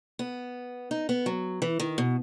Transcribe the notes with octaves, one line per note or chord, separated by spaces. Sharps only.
B3
D#4
B3
F#3
E3
D#3
B2